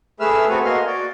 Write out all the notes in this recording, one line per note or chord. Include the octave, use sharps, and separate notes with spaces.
A3 G#4 B4 E5 E6 F6
B3 C4 F#4 A4 B4 G#5
A#3 F#4 D#5 G#5 C6 F6
F#4 D5